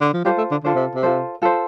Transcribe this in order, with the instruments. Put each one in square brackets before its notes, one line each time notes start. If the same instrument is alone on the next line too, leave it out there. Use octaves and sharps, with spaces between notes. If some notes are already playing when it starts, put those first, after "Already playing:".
[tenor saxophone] D3
F3
[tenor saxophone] G3 [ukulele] F4 A4 C5
[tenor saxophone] A3
D3
[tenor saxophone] D3 [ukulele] F4 A4 C5
[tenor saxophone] C3
C3
[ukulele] F4 A4 C5
F4 A4 C5